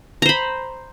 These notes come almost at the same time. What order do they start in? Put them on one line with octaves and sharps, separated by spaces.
A#5 C5 B5